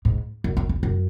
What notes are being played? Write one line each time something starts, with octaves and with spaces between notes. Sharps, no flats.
G#2
F#2
F#2
F2
F#2